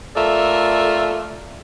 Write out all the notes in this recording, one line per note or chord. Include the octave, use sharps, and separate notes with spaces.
A3 F4 A4 A#4 D5 E5